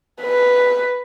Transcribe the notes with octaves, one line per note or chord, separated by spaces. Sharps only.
B4